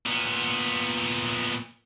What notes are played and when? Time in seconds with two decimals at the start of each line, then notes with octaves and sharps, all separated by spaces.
0.06 A#2 B3